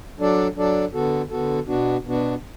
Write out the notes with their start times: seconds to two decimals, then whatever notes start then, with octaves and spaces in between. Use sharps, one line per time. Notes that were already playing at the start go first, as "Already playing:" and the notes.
0.18 F#3 D4 A4 D5
0.55 F#3 D4 A4 D5
0.93 D3 B3 F#4 A4
1.30 D3 B3 F#4 A4
1.67 B2 B3 D4 F#4
2.05 B2 B3 D4 F#4